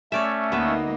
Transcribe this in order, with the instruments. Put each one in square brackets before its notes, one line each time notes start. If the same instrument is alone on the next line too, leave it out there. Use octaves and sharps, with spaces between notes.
[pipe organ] A3 C#4 [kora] C#5 D5 E5
[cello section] D2 A#3 D#4 [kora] B3 E5